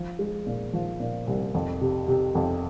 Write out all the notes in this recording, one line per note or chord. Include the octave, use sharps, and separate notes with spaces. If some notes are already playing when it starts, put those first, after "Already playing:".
Already playing: F3
G#3
A#2
F3
A#2
C2
F2
C3
C3
F2